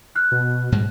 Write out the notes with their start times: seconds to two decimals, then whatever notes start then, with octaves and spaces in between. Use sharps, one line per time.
0.15 F6 F#6
0.32 B2
0.72 G#2 G3 G#3